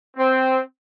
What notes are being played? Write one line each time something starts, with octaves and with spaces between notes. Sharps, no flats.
C4